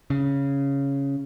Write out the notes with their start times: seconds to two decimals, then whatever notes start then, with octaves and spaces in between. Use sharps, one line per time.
0.10 C#3